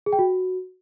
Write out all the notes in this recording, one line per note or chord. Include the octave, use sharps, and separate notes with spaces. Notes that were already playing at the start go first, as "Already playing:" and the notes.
G#4
G5
F#4